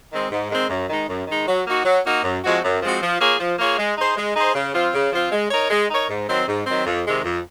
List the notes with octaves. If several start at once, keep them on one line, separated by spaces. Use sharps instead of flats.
D#3 G#3 C4
G#2
D#3 G#3 C4
F#2
D#3 G#3 D#4
F#2
D#3 G#3 D#4
F#3
A#3 D#4 F#4
F#3
A#3 D#4 F#4
F#2
F3 G#3 C4 F#4
F#2
F3 G#3 C4 F#4
F3
A#3 F4 G#4 C#5
F3
A#3 F4 G#4 C#5
G#3
D#4 G#4 C5
G#3
D#4 G#4 C5
C#3
F3 C4 F4
C#3
F3 C4 F4
G#3
D#4 A#4 C#5
G#3
D#4 A#4 C#5
G#2
D#3 F#3 C4
G#2
D#3 F#3 C4
F2
C3 D#3 G#3
F2